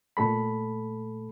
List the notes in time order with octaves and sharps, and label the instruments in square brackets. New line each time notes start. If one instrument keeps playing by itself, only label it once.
[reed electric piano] A#2 A3 A4 B5